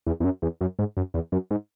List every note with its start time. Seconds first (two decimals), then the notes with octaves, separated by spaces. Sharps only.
0.07 E2
0.20 E2
0.24 F#2
0.42 E2
0.61 F#2
0.79 G#2
0.97 F#2
1.14 E2
1.32 F#2
1.51 G#2